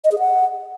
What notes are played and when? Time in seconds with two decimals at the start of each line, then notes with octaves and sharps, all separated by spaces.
0.04 D#5
0.12 G#4
0.19 F#5